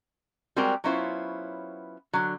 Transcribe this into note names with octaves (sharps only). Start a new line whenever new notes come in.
G3 G#3 C4 F#4 G4 A#4
F#3 B3 C#4 E4 F4 C5
D3 F#3